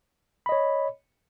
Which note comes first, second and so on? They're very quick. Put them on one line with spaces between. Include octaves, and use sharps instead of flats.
B5 D#5 C#5